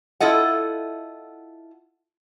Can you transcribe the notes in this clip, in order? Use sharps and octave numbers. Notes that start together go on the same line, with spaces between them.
E4 F4 A4 D#5 F#5